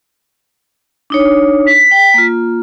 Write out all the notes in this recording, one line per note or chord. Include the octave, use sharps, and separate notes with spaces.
D4 D#4 C#5
B6
G5
A#3 F4